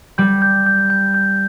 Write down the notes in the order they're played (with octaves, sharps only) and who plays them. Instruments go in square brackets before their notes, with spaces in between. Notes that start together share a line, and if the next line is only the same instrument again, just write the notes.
[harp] G3 [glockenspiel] G6
[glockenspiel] G6
G6
G6
G6